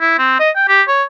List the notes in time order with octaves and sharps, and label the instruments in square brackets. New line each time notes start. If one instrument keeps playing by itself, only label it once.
[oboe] E4
C4
D#5
G5
G4
C#5